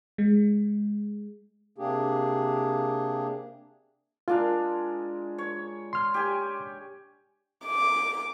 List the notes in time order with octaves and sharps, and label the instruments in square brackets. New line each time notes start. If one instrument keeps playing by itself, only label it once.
[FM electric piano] G#3
[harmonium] C3 A#3 D4 G4 G#4
[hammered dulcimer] G#3 D4 A#4 [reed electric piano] F4
[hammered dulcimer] C#5
[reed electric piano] C6 F6
[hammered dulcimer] G4 G#5
[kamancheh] D6